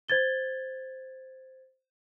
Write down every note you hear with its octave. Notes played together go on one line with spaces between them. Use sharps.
C5 G#6 A6 G7